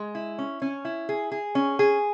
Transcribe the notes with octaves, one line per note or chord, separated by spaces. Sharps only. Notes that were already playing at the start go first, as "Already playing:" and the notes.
Already playing: G#3
E4
C#4
C#4
E4
G#4
G#4
C#4
G#4